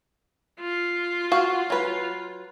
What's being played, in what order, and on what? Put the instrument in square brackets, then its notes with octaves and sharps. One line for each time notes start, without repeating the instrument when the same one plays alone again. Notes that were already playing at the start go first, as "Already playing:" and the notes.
[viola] F4
[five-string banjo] F#4 F5
F#3 B4